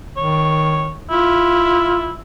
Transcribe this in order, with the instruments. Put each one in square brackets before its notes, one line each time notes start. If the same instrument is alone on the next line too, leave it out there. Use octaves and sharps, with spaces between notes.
[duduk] D#3 [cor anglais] C#5
[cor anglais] E4 [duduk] F4